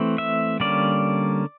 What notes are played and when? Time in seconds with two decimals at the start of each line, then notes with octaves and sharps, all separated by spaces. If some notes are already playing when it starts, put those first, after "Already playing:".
Already playing: E3 A3 C4
0.18 E5
0.60 D3 G3 A#3 C#4 D5